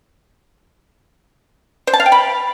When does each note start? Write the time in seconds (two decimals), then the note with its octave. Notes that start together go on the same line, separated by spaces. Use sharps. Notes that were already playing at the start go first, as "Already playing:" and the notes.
1.87 C5
1.93 A5
2.00 F5
2.06 G5
2.12 B5